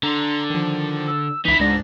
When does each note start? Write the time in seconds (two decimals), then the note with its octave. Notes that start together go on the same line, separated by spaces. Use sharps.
0.03 D3 A#5 C6
0.50 D#3 F3
1.07 E6
1.45 C#2 E3 D#4 E4 B6
1.60 C#2 G#2 D4 D5 A#6